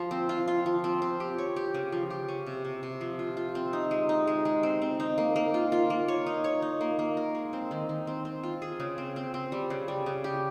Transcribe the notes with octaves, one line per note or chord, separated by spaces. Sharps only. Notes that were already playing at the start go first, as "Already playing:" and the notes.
Already playing: F3 F4
C4
F4
F4
F3
C4
C4
G4
C#5
G4
C#3
F3
G4
C#4
C3
C3
C3
F3
F4
F4
C4
D#4
G#3
D#4
G#3
G#3
C4
C4
D#4
A#3
A#3
F4
F4
A#3
C#5
D#4
C#5
D#4
A#3
A#3
A#4
G#3
C4
D#3
D#3
C4
C4
F4
G#4
C#3
C4
C4
C4
G3
C#3
G3
C#3
G4